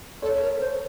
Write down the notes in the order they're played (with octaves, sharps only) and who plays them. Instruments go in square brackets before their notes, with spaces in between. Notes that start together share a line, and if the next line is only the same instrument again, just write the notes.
[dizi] A4 [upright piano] C#5
[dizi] A#4
C5